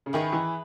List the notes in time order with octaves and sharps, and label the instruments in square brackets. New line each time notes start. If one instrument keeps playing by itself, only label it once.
[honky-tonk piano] C#3
[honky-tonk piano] D#3 [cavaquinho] E4 G#4 B4
[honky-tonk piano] E3